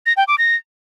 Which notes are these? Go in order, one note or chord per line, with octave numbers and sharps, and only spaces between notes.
A#6
G5
D6
A#6